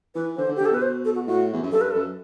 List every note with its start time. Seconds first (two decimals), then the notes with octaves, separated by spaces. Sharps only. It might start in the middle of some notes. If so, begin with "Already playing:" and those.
0.15 E3 B4
0.37 D3 C5
0.48 D3
0.56 G4
0.60 D3
0.66 A4
0.71 B2 B4
0.82 C5
1.05 A4
1.15 F#4
1.27 A2 F#4
1.53 E2
1.62 F#2
1.72 G2 A4
1.81 B4
1.91 A4
1.94 F#2